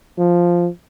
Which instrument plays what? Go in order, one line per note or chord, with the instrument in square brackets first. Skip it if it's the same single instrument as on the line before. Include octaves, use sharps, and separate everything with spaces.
[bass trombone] F3